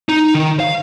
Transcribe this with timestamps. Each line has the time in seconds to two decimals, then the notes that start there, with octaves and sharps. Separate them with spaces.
0.09 D#4
0.34 D#3
0.60 F5